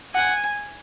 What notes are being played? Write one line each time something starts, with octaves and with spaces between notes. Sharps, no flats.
F#5 G#5